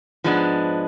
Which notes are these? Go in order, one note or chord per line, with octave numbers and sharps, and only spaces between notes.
G#2 F3 G#3 B3 D4